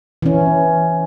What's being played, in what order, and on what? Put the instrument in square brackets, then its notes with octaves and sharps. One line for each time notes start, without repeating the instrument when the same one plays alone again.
[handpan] E3 C#4